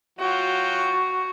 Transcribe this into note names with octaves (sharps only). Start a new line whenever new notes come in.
F#3 F4 F#4 G5